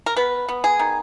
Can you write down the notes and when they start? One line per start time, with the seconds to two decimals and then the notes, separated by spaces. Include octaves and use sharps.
0.06 A#4
0.16 B3 B4
0.49 B3
0.64 G#4
0.79 D#3